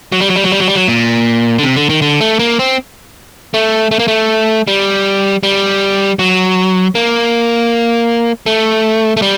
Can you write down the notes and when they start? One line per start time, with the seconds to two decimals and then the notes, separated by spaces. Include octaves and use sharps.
0.12 F#3
0.20 G3
0.28 F#3
0.36 G3
0.44 F#3
0.52 G3
0.60 F#3
0.68 G3
0.75 F#3
0.88 A#2
1.58 D3
1.63 C3
1.76 D3
1.89 D#3
2.02 D3
2.21 A3
2.39 A#3
2.59 C4
3.54 A3
3.91 A3
3.99 A#3
4.08 A3
4.67 G3
5.43 G3
6.19 F#3
6.95 A#3
8.46 A3
9.17 A3
9.22 G3